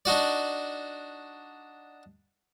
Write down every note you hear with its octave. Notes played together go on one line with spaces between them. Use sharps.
D4 D#4 F#4 D5